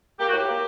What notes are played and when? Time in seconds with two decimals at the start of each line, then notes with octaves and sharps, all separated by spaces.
0.19 A#3 G4
0.27 F#4
0.32 A2 G4
0.48 A#3